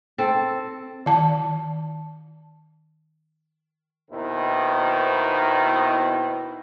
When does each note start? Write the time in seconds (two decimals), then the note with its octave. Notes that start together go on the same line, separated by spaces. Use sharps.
0.18 C4 A4
1.06 D#3 A5
4.11 D#2 B2 D#3 E4 C5